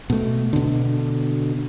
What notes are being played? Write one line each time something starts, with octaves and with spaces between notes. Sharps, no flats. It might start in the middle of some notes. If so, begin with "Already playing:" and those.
B2 A3
B2 D3